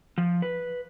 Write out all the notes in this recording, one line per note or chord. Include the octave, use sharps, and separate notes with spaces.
F3
B4